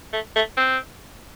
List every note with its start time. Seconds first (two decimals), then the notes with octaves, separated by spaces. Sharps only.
0.13 A3
0.36 A3
0.57 C4